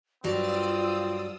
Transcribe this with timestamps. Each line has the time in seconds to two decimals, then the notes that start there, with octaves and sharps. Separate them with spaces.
0.24 G2 F#3 C4 F4 D5 D#6 E6